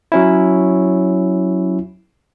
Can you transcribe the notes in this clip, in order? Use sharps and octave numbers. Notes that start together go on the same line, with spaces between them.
F#3 C#4 E4